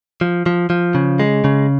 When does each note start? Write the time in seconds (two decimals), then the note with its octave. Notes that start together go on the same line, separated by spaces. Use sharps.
0.21 F3
0.46 F3
0.70 F3
0.95 C#3
1.20 G#3
1.44 C#3